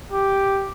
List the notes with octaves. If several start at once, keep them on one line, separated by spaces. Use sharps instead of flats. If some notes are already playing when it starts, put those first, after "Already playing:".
G4